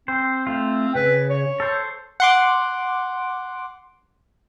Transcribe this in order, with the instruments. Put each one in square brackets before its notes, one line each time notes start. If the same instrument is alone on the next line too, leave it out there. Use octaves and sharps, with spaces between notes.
[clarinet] C4 [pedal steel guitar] C5
[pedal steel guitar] A3 F4
[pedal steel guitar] C#3 [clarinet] B4
[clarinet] C#5
[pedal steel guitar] A4 C5
[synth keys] F#5 C6 D6